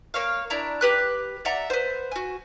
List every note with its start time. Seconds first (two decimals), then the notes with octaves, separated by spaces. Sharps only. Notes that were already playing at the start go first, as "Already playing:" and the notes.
0.14 A#3 C#5 F5
0.50 D4 E4 A#5
0.81 G4 B4 F#6
1.45 D5 E5 F#5 A#5
1.70 B4 C5
2.11 F#4 G#5